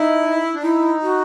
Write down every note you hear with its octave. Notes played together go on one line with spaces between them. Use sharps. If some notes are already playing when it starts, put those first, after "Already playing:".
Already playing: D#4 E4
D4
D#4 E4
F#4